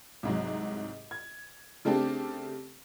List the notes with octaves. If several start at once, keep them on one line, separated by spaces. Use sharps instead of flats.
C2 G#2 F#3
G#6
C#3 A3 C4 D4 G4